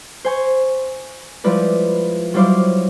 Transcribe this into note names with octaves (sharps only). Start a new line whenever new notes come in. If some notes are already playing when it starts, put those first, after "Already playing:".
C5 G#5 C#6
F3 G3 G#3 E4 B4 D5
F#3 G3 E4 C5 F5 D6